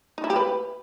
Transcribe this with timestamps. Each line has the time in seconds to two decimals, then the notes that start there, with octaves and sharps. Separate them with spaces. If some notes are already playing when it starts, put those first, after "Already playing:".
0.18 D#4
0.24 E4
0.30 G4
0.36 B4